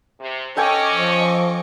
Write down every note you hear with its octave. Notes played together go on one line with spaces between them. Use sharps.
C3
C#4 A4 D#5 G5 G#5 C#6 D6
F3